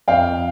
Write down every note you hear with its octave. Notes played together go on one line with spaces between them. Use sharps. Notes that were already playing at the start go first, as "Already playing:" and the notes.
F2 F5 G5